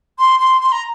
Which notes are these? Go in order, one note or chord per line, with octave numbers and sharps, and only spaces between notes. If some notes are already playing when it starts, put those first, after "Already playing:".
C6
C6
C6
A#5